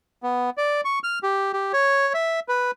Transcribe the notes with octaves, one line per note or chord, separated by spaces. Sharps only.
B3
D5
C#6
F6
G4
G4
C#5
E5
B4